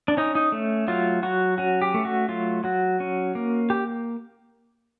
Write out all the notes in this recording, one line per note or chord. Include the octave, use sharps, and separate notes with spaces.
D4
C#4 D#4
D#4
A3
F#3 F4
F#3 F#4
C#4 F#4
G4
A3
F#4
F#3 F4
F#3 F#4
C#4
A#3
G4